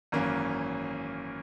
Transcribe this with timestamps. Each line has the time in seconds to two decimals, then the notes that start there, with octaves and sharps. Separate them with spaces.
0.12 G#1 F#2 E3 A#3 C#4